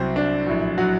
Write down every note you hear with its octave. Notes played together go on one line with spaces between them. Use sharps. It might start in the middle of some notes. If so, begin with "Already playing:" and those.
Already playing: C2 C3 F#3 C4
D4
A#1 A2 F#3
F#3 F#4